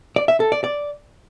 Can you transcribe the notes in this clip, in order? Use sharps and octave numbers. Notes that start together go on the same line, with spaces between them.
D5
E5
A4
D5
D5